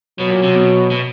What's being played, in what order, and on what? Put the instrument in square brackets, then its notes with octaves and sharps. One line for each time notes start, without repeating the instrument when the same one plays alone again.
[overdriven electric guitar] B2 [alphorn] F#3
[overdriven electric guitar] A#2
C3
B2
B2